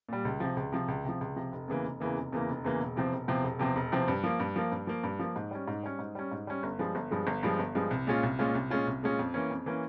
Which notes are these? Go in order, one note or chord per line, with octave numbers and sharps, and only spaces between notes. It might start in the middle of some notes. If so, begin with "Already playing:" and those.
A#2 G3
C#2
C3 F3
C#2
C3 F3
C#2
C3 F3
C#2
C3 F3
F1
E2 C#3 E3 A#3
F1
E2 C#3 E3 A#3
F1
E2 C#3 E3 A#3
F1
E2 C#3 E3 A#3
E1
E2 C3 F3 C4
E1
E2 C3 F3 C4
E1
E2 C3 F3 C4
E1
E2 C3 F3 C4
G2
F3 A#3
G2
F3 A#3
G2
F3 A#3
G2
F3 A#3
G#2
G3 C#4
G#2
G3 C#4
G#2
G3 C#4
G#2
G3 C#4
G1
G2 F3 G#3
G1
G2 F3 G#3
G1
G2 F3 G#3
G1
G2 F3 G#3
C2
A#2 G#3 C#4 F4
C2
A#2 G#3 C#4 F4
C2
A#2 G#3 C#4 F4
C2
A#2 G#3 C#4 F4
F2
E3 A#3 C#4
F2
E3 A#3 C#4